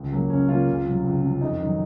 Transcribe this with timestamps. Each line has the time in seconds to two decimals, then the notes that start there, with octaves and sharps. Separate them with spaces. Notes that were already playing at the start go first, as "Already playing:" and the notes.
Already playing: C#2
0.11 C#3 F#3 A#3
0.29 C#2 C#4
0.48 C#3 F#3 A#3 F4
0.67 C#2
0.85 C3 F#3
1.04 C#2
1.22 C3 F#3
1.41 F2 D#4
1.60 D#3 F#3